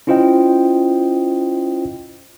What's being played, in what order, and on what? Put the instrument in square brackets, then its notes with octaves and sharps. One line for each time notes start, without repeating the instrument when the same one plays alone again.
[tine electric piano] C#4 E4 F4 C5 D#5 G5